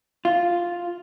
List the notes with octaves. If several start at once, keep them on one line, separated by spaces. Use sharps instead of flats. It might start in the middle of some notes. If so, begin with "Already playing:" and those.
F4